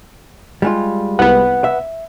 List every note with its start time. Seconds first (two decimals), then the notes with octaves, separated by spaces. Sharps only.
0.62 G3 G#3 F4
1.19 C2 B3 B4 F#5
1.64 E5